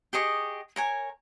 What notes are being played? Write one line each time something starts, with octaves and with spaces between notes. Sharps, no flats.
G4 G#4 D#5 C#6
A#4 C#5 G#5